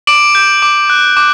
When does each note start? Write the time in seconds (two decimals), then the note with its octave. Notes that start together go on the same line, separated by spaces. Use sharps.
0.07 D6 D7 F#7
0.35 G6
0.62 D6
0.90 F#6
1.17 D6